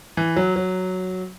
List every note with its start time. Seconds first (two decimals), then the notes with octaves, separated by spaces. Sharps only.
0.17 E3
0.37 F#3
0.56 F#3